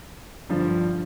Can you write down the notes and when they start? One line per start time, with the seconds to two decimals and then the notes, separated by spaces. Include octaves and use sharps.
0.50 G2 D3 F3